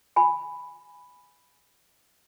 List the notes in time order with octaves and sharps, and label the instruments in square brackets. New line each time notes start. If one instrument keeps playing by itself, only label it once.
[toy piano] G#5 B5